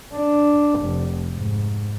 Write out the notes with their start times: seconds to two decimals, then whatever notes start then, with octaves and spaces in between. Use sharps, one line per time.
0.15 D4
0.81 F1
1.35 G#2